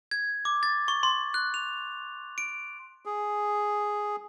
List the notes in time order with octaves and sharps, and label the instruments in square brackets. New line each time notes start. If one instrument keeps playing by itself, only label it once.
[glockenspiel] G#6
D6
A6
C#6
C6
F#6
F7
D7
[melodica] G#4